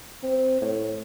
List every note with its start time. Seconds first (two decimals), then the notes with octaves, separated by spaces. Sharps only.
0.23 C4
0.61 A2